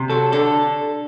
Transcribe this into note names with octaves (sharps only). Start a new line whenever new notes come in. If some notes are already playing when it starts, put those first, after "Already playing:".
Already playing: C3
F#3 A4
D3 A4